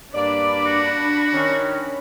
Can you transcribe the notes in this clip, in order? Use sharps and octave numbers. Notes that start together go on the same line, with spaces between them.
G2 A#3 D4 D5 B5
F#4
D#3 C#4